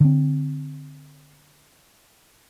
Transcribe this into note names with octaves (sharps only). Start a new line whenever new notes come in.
D3 C4